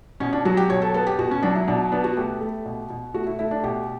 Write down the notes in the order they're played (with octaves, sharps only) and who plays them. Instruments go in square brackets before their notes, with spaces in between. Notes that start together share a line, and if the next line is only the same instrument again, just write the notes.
[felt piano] B2 C#4
D4
F#3 F#4
G4
B2 C#5
A4
B3 A4
G4
B2 F#4
C#4
F#3 D4
E4
B2 D4
B3 D4
F#4
A3 G4
A3
B2
B2
A3 F#4
E4
A3 E4
D4
B2 G4